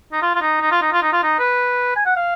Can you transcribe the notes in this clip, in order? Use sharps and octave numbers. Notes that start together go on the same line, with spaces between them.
D#4
F4
F4
D#4
D#4
F4
D#4
F4
D#4
F4
D#4
B4
G#5
F#5
F5